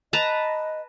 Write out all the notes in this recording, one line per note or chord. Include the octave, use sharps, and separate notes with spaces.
B4 D#5 A5 A#5